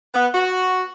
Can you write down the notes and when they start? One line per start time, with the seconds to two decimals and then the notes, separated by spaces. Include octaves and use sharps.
0.14 B3
0.34 F#4